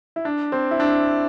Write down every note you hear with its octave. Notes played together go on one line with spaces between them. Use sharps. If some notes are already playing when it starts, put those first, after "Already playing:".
E4
D4
C4
E4
D4